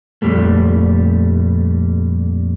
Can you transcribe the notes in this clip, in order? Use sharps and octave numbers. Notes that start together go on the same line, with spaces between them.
F2 A#2 G3 A3